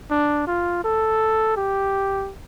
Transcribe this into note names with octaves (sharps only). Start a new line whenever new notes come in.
D4
F4
A4
G4